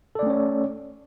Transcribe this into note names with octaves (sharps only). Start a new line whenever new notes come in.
A3 C#4 A4 C#5 D5